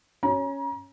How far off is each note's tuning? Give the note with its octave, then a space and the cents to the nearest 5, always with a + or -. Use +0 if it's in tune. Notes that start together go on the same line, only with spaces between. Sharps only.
C#4 +0 A#5 +35